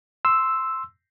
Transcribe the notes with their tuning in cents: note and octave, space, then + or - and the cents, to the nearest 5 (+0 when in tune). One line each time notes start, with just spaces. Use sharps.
C6 +0 E6 +0